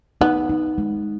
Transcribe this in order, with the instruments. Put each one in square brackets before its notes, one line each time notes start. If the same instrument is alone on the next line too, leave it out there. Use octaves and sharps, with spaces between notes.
[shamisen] B3 [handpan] D#4
[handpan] D#4
G#3